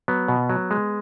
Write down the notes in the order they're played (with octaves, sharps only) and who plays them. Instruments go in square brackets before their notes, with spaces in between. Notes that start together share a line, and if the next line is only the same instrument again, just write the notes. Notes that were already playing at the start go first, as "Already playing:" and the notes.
[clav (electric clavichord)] F#3 B3
B2
F#3
G#3